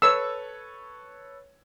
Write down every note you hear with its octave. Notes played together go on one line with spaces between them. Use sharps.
A4 B4 C#5 E6